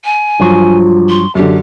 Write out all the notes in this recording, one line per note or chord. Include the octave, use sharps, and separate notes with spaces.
G#5
G2 F3 F#3 F4
C6
F#2 D3 G4